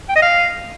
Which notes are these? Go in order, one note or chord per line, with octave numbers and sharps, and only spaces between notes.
G5
D#5
F5